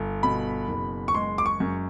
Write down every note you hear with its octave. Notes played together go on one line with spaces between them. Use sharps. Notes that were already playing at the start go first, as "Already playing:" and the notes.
Already playing: G1
B2 B5
F#1
C#6
G#3 C6
D6
C#6
F#2